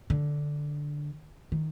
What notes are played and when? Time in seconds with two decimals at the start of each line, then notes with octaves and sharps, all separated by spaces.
0.10 D3
1.52 D#3